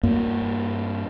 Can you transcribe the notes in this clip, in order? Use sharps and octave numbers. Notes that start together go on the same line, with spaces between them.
G2 A#3